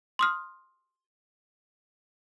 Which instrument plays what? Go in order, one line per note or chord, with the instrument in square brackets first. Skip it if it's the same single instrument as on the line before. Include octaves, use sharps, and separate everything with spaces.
[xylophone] C6 D#6 F6